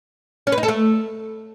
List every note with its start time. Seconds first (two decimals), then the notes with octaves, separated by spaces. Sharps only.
0.47 C#4
0.52 B4
0.58 D#4
0.63 A4
0.68 A3